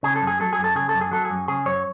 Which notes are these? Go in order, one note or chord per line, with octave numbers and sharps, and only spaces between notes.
C#3 G#4
A4
F#2
G#4
F#3 A4
G#4
F#2
A4
C#3 G#4
A4
F#2
G#4
F#3 A4
G#4
F#2
C#3 G#4
F#2 C#5